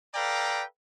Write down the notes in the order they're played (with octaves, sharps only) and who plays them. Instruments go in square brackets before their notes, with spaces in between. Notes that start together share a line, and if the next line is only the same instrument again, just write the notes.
[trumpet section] A4 B4 D5 F5 G5 A#5